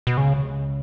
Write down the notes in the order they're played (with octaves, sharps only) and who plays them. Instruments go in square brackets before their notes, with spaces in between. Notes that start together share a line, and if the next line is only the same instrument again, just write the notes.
[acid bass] B2
[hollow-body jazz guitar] C#2 [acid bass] C#3
[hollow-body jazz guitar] C#2